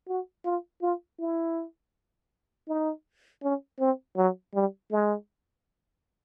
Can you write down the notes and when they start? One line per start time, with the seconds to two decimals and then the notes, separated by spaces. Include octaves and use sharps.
0.08 F#4
0.45 F4
0.82 F4
1.19 E4
2.68 D#4
3.43 C#4
3.80 C4
4.17 F#3
4.54 G3
4.91 G#3